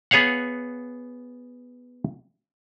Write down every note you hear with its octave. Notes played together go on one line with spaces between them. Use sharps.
B3 G#4 C#5 F5 F#5